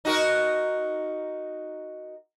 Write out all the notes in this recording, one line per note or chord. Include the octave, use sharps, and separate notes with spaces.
D#4 F#4 A#4